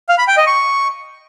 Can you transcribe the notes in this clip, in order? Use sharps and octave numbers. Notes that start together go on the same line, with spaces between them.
F5
B5
G5
D#5
C#6